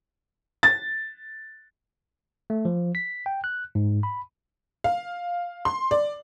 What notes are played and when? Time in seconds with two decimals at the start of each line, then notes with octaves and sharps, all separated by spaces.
0.63 A6
2.50 A3
2.65 F3
2.95 B6
3.26 G5
3.44 F#6
3.75 G#2
4.03 B5
4.84 F5
5.65 C6
5.91 D5